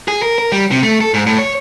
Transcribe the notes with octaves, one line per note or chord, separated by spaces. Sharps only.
G#4
A#4
A#4
G3
C3
A3
A4
G#2
A2
C#5